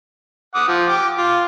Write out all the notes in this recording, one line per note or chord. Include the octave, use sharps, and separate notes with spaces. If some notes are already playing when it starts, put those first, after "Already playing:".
F#5 D6 D#6
F3
G5 D6
F4